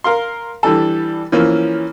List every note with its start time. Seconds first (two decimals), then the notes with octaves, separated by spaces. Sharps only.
0.04 A#4 F5 C6
0.63 E3 G3 D4 A4
1.32 E3 F3 A#3 C#4